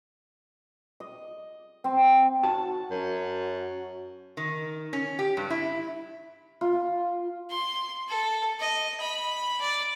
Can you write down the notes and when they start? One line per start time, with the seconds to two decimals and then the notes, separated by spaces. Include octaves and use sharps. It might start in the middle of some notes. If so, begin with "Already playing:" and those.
1.00 D#5
1.84 C4
2.43 F#4 A5
2.90 F#2
4.37 D#3
4.93 C#4
5.19 G4
5.37 G2
5.50 E4
6.61 F4
7.50 C6
8.09 A4
8.60 D#5
9.00 B5
9.61 D5